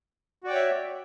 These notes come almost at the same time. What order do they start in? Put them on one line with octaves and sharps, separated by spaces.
F#4 D5 G5 C#5 E5